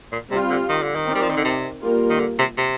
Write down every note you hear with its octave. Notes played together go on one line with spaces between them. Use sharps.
A#2
C3 G3 C4 F4
D3
D#3
D3
D#3
C4 D#4 A#4 D5
G3
F3
D#3
D3
C3
G3 A#3 F4 A#4
D#3
D3
C3
C3